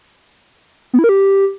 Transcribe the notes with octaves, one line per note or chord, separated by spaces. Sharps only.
B3
E4
A#4
G4